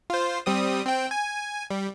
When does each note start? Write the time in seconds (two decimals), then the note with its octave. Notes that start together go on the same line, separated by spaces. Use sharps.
0.10 F4 C5
0.46 G3 C4 D#6
0.85 C4 G5
1.11 G#5
1.70 G3